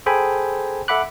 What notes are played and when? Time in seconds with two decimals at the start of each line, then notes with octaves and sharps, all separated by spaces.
0.06 G#4 A4 C5 G5 G#5 B5
0.88 A4 E5 F#5 B5 D6 F#6